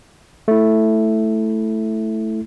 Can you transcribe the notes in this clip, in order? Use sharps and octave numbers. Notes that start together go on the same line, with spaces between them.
A3 E4